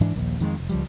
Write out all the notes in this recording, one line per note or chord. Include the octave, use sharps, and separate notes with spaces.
G#2 E3 D4
A#1 D#2
F2 D#3 F3 G#3
F1
C#2 F3 G3